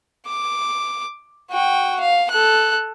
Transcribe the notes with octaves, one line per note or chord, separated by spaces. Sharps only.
D6
F#4 G5
F5
A4 F#6